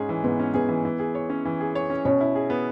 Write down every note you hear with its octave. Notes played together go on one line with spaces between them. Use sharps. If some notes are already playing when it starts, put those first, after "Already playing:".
Already playing: G#2 C#4 G#4
E3
G#2 B3 B4
C#4
B3 G#4 B4
E3
E3
G#4
C#5
C#4
E3
G#4
C#5
C#4
B2 C#4 C#5
E4
G#4
B3